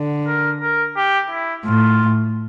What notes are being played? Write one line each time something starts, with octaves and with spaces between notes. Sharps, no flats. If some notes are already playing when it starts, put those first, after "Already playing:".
Already playing: D3
A#4
A#4
G4
E4
A2 F4